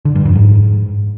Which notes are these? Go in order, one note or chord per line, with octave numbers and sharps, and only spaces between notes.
D3
G2
F2
G#2